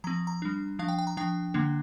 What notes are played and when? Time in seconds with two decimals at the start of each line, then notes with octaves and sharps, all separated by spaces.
0.04 F3 C4 A#5
0.27 A#5
0.42 G3 D4
0.79 F3 D4 F5
0.88 G5
0.99 G5
1.07 A#5
1.17 F3 D4 G5
1.54 D3 A#3 D4